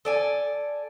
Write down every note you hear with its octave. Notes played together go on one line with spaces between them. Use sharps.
A4 D5 G#5